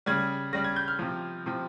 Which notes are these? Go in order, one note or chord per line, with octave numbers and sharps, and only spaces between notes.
C#3 G3 G#6
C#3 G3 A#6
G#6
G6
F6
C3 F3
C3 F3